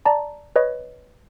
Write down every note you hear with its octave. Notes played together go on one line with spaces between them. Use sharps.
D5 A5 A#5
B4 C#5 D#5